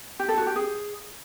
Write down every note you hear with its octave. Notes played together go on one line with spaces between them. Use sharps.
G4
A4
F#4
G4
G#4